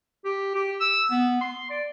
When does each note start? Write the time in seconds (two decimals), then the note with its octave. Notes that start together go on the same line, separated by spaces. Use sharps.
0.25 G4
0.55 G4
0.81 E6
1.11 B3
1.41 C6
1.70 D5